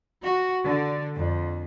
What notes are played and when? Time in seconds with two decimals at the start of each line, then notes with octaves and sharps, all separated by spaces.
0.22 F#4
0.65 D3
1.17 F2